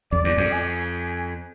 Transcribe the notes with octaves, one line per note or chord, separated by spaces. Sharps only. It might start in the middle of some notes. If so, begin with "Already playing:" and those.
F2 D5
E2
F2
G#5